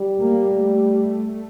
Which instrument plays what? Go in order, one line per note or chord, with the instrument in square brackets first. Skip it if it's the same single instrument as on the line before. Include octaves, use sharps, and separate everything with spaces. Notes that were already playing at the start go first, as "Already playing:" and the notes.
Already playing: [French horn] G3
[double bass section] A#3
A3